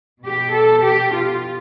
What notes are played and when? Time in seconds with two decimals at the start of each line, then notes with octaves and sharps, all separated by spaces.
0.23 B2 G4
0.52 A4
0.82 G4
1.11 F4